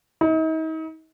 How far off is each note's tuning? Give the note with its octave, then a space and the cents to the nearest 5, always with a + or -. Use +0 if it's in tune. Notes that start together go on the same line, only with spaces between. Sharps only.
D#4 +40